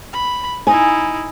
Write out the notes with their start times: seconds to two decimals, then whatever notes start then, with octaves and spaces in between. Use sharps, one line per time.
0.13 B5
0.67 D#4 E4 G#5